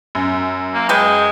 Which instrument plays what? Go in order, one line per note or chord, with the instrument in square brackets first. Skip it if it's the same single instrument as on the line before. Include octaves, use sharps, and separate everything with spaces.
[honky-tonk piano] F#2
[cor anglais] A#3
[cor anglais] G#3 [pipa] B4 G5